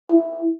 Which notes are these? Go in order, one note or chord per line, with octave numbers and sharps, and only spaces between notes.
E4